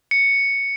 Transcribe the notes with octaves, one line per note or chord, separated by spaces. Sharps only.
C#7